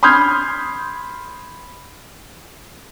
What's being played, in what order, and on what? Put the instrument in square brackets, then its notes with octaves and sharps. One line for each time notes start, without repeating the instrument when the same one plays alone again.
[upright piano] B5 C6 D#6 F6 G6 G#6